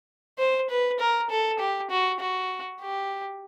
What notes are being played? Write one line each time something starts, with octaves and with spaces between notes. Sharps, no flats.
C5
B4
A#4
A4
G4
F#4
F#4
G4